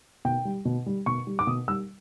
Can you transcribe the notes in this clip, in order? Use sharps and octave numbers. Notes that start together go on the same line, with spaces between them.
B2 G5
G3
B2
G3
B2 C#6
G3
D6
B2 D#6
G3 E6